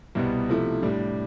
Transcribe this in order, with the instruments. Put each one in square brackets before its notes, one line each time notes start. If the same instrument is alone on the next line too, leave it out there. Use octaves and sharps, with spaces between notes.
[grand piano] C2 B2 G3 B3
C3 F3 A3 E4
A2 G3 D4